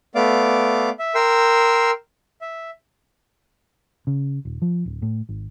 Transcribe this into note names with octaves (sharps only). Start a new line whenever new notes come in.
A3 B3 D5 F5 D6
E5
A#4 G5 C6 E6
E5
C#3
D#1
F3
D1
A2
G#1